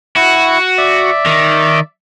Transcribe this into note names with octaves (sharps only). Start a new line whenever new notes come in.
E4 F#4 F#5
D5 E5
D#3